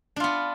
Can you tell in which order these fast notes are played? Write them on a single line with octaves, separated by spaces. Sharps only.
D4 F4 B3